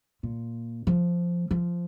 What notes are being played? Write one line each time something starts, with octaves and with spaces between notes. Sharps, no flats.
A#2
F3
F3